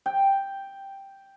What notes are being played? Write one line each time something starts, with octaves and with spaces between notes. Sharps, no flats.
G5